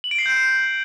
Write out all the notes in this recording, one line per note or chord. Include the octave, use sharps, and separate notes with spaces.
F#7
D7
C7
G6